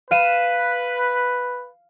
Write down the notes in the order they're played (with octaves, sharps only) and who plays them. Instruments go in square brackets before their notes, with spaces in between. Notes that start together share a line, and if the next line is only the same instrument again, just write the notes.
[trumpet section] B4 [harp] F5 D#7 E7